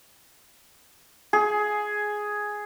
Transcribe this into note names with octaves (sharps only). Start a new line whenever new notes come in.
G#4